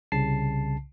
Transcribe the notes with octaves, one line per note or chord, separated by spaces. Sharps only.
C2 C#3 A5 C7